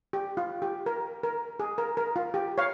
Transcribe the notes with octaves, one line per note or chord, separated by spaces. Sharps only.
G4
F4
G4
A#4
A#4
G#4
A#4
A#4
F4
G4
C#5 F5